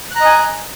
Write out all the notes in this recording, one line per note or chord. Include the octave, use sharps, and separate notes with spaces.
D#5 G#5 A#5 F#6